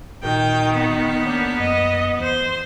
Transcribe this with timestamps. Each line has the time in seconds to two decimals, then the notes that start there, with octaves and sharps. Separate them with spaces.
0.24 A#2 D#3 F#4 A#4 G5
0.74 B3
1.26 A#3 D4 C#5 D6 G6
1.60 F#2 D#5
2.20 E2 C5 C6